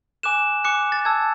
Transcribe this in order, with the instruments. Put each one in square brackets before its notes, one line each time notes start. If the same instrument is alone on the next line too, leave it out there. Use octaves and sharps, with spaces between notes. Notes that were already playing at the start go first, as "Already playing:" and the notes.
[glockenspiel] G#5 D6 F#6 E7
G#5 D6 F#6 C#7
A6
A5 E6 G#6